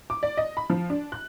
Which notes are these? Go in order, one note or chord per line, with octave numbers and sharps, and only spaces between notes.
D6
D5
D#5
B5
F3
D4
F#6